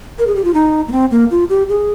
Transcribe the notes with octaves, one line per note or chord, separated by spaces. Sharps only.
A#4
G#4
G4
F4
D#4
A#3
C4
A#3
F4
G4
G#4